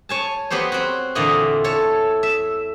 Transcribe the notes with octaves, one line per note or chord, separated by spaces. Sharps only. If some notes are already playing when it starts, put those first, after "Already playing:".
C#5 G#5 A5
F#3 B3 G4 C5 C#5
C4 F#4
E2 A#2 D3 E4 D#5 G#5
A4 C#5
E5